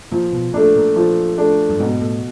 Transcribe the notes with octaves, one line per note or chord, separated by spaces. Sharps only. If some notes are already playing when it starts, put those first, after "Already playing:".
A#2 F3
B2
A#2 A3 D4
A#2
F3
A3 D4
G2
G#2 B2
A2